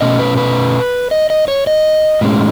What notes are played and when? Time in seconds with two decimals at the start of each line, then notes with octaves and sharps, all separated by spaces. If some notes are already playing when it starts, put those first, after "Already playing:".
0.01 B2 A3 C#4 D#5
0.19 B4
0.37 B4
1.11 D#5
1.30 D#5
1.48 C#5
1.67 D#5
2.21 A2 G#3 C#4